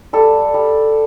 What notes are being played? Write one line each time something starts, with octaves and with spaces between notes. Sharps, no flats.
G3 A4
G3